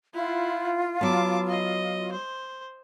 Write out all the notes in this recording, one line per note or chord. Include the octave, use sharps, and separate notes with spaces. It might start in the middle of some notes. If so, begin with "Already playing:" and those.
E4 F4 F#5
F#3 B3 A5 D6
D#5
C5